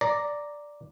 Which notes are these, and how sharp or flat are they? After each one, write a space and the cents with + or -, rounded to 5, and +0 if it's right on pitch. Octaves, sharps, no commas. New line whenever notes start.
D5 +0 A#5 +0